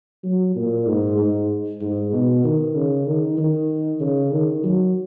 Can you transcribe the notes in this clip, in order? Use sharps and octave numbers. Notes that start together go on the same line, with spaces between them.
F#3
A#2
G#2
G#2
G#2
B2
D#3
C#3
D#3
D#3
C#3
D#3
F#3